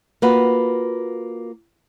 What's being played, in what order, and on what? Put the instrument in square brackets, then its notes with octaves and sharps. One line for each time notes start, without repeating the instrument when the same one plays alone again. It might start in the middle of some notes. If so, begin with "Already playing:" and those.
[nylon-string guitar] A#3 F4 F#4 B4